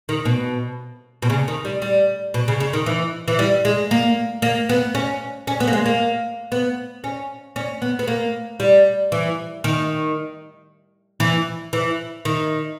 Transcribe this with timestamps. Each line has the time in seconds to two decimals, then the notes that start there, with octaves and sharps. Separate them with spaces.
0.09 D#3
0.25 B2
1.22 B2
1.30 C#3
1.48 D#3
1.65 G3
1.82 G3
2.34 B2
2.48 C#3
2.60 C#3
2.73 D#3
2.86 E3
3.28 E3
3.39 G3
3.65 G#3
3.91 A#3
4.42 A#3
4.69 B3
4.95 C#4
5.47 C#4
5.60 B3
5.67 A#3
5.73 G#3
5.86 A#3
6.52 B3
7.04 C#4
7.56 C#4
7.82 B3
7.99 B3
8.08 A#3
8.60 G3
9.12 E3
9.64 D#3
11.20 E3
11.73 E3
12.25 D#3